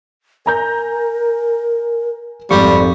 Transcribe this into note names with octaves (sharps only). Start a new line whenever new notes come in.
A#4 G#5 A#5 G6
G#1 F2 G3 A4 C#6